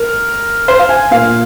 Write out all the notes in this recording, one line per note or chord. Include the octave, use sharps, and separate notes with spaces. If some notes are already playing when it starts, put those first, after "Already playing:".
Already playing: A#4
C5
F5
G#5
A#2 A#3 F5